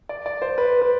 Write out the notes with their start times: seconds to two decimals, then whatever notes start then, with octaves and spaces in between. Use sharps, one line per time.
0.09 D5
0.26 D5
0.42 C5
0.58 B4
0.81 B4